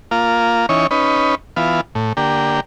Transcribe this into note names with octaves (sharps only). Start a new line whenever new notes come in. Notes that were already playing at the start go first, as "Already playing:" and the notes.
A#3 F4
E3 C#4 D#4 C#5
C#4 D#4 B4
E3 B3 F4
A2
D3 A#3 G4